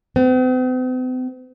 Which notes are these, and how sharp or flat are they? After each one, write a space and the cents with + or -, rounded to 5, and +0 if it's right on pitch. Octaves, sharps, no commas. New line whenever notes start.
C4 -45